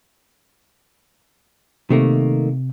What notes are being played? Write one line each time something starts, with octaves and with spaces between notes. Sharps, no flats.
C3 D#3 A3 A#3